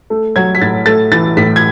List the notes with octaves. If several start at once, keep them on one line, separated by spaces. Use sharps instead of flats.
A3
F#3 G#6
B6
A2 A6
A3 A6
E3 A6
A2 B6
G#6